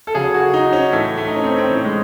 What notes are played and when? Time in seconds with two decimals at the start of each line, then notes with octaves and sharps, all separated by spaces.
0.07 A4
0.15 C#3 F#3 G#4
0.34 F#4
0.54 D#4
0.67 D#4
0.73 C#4
0.92 A2 E3 A3
1.17 A3
1.28 D#4
1.36 C#4
1.44 C4
1.58 C4
1.69 A2 E3 C#4
1.85 G#3